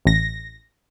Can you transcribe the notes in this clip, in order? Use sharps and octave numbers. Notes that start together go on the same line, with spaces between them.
A1 A#6